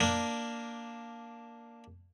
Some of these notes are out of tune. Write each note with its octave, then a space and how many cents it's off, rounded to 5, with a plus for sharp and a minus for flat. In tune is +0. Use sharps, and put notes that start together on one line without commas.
A#3 +0 D4 +0